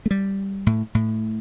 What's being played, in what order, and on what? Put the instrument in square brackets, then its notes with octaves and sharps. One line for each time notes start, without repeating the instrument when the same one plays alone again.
[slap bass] A3
G3
A2
A2